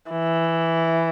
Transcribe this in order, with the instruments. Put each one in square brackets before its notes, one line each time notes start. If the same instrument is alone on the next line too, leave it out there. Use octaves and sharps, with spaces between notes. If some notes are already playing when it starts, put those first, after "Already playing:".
[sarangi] E3